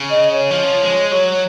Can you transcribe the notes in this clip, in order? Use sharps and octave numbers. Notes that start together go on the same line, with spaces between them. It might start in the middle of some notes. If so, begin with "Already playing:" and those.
Already playing: C#3
D#5
C#5
F3
G#3
F#3